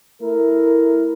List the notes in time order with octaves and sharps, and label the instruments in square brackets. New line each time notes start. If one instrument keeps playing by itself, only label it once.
[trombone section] A3 E4 A#4